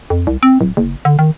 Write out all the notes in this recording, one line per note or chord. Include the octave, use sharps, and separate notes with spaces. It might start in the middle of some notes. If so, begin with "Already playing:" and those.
F2
C2
C4
D1
F#1
D3
D#3